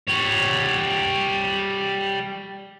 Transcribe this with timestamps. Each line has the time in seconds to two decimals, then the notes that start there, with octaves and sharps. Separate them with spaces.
0.08 G3 C#5